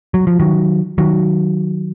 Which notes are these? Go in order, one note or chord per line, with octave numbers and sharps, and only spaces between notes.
F#3
F3
D#3 F#3
D#3 F#3